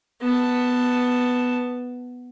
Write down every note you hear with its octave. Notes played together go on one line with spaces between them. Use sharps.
B3 A5